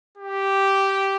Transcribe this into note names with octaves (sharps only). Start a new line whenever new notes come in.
G4